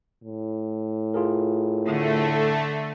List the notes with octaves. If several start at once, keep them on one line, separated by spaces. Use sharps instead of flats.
A2
F4 G#4 A#4
D3 A3